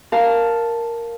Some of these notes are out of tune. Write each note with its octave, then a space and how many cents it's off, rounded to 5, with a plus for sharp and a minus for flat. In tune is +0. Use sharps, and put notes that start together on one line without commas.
A#4 +0 F5 +0 A5 +0